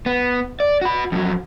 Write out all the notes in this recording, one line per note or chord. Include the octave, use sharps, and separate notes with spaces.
B3
D5
F#4 B5
F2 F#3